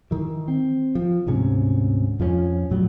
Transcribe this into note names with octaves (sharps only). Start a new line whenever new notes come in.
D#3 E3
C4
F3
D2 G#2 C3 C#4
F2 F3 A3 C#4
A#1 A2 F#3 G3